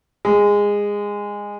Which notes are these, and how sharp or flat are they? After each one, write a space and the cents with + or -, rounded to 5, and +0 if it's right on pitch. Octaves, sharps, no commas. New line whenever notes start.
G#3 -20